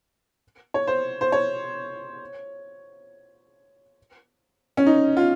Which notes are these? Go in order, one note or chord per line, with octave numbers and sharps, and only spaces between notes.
C#5
C5
C5
C#5
C#4
D#4
F4